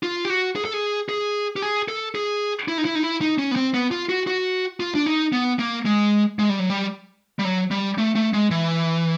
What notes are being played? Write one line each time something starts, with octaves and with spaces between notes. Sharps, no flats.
F4
G4
F#4
G#4
A4
G#4
G#4
G4
G#4
A4
G#4
E4
D#4
E4
D#4
E4
D#4
C#4
B3
C4
B3
F4
F#4
F#4
F4
D4
D#4
B3
A#3
G#3
G#3
G3
F#3
G3
G3
F#3
G3
A3
A3
G#3
E3